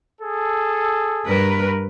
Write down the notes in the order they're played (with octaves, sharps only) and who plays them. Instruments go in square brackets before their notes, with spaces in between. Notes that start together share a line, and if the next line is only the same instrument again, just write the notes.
[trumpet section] G#4 A4
[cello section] G2 A#4 B4